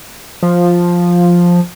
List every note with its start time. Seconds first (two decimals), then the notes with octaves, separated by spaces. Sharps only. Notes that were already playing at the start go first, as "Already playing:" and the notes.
0.43 F3